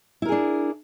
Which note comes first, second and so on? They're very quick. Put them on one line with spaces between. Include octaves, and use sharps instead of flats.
E4 A#4 G#4 D4